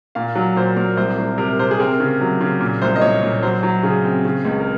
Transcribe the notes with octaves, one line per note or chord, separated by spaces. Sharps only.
A#2 F5
F#3
A#2 C5
A#2 A#4
C2 C5
C2
C3 A#4
C3 C5
G#4
C4 A#4
C#3
F#3
C#3
A#2
C2 C5
D#5
A#2 C#5
A#2
F#3 C5
F#3
C#3 G#4
C4
C#3
C#2
A#4